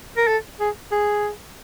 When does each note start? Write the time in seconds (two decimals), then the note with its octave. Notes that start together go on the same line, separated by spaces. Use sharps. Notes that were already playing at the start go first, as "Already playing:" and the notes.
0.17 A#4
0.28 A4
0.60 G#4
0.92 G#4